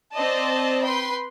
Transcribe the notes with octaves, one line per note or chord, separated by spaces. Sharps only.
C4 C5 D5 D#5 A5
B4 G5 B5 C6